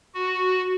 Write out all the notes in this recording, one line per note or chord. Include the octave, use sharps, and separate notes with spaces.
F#4